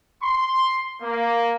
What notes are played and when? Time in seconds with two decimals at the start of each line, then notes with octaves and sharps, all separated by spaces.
0.23 C6
1.01 A#3